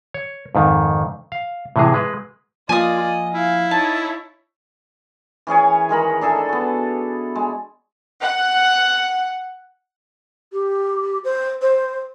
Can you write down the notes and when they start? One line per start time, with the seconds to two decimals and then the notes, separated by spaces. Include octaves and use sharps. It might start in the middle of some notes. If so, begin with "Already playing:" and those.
0.14 C#5
0.55 F2 G#2 D#3
1.32 F5
1.76 A2 C3 E3 G#3 G#4
1.94 G#3 B4
2.69 F3 A#3 F4 D5 D#5 G#5 D#6
3.01 D#5
3.34 E4 F5
3.71 D#4 C#5 A5
5.47 E3 C#4 G#4 C#5
5.89 D#3 G#3 A#4 B5
6.21 D4 G#4 A4 E5
6.49 B3 F#4
7.35 G#3
8.22 F#5
10.52 G4
11.24 C5
11.62 C5